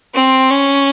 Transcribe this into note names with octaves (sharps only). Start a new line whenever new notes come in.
C4
C#4